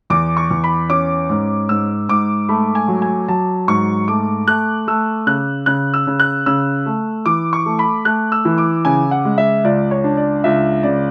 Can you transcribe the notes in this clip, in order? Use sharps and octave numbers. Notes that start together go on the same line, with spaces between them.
E2 D6
C#6
E2
B5
C#4 D6
G#2
G#2 E6
G#2 D6
A3 B5
G#5
F#3
G#5
F#3 A5
G#2 C#6
A3 D6
A3 F#6
A3 E6
C#3 F#6
C#3 F#6
E6
C#3
F#6
C#3 E6
A3
E3 D6
C#6
A3
B5
A3 F#6
E6
E3
D6
C#3 G#5
F#5
G#3
E5
C#2 D5
C#5
D4
D5
C#2 E5
C#3 D5